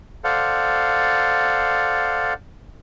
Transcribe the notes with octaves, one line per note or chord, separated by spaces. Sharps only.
A4 C5 D5 F5 F#5